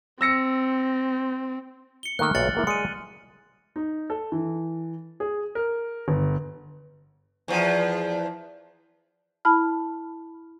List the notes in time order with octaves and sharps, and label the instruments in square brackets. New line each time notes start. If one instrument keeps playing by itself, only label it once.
[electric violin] C4 [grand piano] E6 A#6 C#7
[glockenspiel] C#7 G7
[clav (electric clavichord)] D#3 A3 A#3 [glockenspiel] F6 F#6
[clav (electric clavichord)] B1 A#2 E5 [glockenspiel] A6 C#7 F#7
[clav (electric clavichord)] G#3 A#3 E4
[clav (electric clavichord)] G#3 D5 [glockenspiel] C#7 D#7
[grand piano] D#4
A4
E3
G#4
A#4
G1
[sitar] E2 F3
[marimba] E4 A5 B5 F6